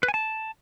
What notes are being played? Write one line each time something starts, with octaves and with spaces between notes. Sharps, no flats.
B4
G#5
A5